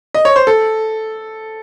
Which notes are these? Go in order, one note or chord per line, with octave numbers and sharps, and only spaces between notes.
D#5
C#5
C5
A4